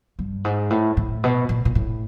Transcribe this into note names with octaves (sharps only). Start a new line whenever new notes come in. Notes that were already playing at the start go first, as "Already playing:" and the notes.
G2
G#2
A2
A2
B2
A#2
A#2
A2